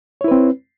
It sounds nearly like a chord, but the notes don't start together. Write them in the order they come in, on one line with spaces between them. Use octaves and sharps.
C#5 E4 B4 C4